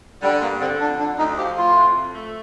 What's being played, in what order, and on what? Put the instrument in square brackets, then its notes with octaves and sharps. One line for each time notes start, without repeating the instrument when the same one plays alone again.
[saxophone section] D3 [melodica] G3
[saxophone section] G2 [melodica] A#3
[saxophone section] D3 [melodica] C4
[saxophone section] F2 [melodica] D4
[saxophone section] D3 [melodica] D4
[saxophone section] D2 [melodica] D#4
[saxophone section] F3 [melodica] G4
[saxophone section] A2 [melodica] F4
[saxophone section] C3
F2
A3